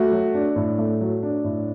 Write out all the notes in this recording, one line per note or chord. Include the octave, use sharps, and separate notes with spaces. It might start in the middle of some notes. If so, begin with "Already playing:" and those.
Already playing: A3 F#4
F#3
D4
A2
A3
F#3
D4
A2